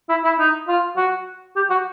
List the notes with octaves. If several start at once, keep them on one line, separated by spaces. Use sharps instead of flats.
E4
E4
D#4
F4
F#4
G4
F#4